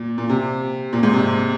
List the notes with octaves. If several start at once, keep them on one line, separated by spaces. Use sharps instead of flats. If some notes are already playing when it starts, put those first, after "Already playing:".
Already playing: A#2
A#2
C3
A#2
G#2
C3